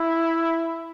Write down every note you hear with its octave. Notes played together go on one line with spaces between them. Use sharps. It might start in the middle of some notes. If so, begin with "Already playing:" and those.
Already playing: E4